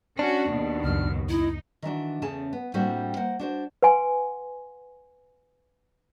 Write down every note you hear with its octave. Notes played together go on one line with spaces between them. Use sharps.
C#4 D4 F#4
D#2 B2
C#2 F#2 F6
D#4 E4
D#3 E3 D4 F#4
E2 C#3 A3 C#4 G#4 A5
B3
A2 G3 A#3 C4 D4 F#4
A#3 A#4 C5 F#5
D4 F#4 C5
B4 F#5 G#5 C6